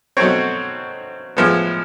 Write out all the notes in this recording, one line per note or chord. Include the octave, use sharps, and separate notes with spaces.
B2 F#3 A3 C4 C#5
A2 F3 G#3 B3